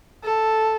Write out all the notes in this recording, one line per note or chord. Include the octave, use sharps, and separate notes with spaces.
A4